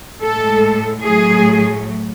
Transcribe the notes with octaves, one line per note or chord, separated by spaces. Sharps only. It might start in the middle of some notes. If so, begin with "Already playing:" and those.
A2 G#3 A4
A2 F#3 A3 G#4